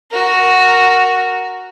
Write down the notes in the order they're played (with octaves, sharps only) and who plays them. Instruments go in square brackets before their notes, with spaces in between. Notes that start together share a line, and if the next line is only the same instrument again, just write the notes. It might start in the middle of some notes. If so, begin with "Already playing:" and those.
[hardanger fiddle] F#4 A#4